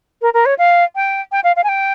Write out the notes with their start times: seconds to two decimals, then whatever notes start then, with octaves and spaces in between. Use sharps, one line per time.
0.22 A#4
0.34 A#4
0.46 C#5
0.58 F5
0.96 G5
1.32 G5
1.44 F5
1.56 F5
1.64 G#5
1.69 G5